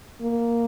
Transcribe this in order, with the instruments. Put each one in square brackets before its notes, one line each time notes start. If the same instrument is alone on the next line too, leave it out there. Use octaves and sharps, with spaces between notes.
[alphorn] A#3